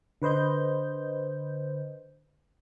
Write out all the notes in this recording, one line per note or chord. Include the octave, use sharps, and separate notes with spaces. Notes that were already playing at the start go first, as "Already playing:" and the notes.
D3 B4 C5 D#5 G6